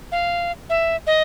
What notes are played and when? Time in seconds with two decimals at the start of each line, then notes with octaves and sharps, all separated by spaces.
0.12 F5
0.70 E5
1.07 D#5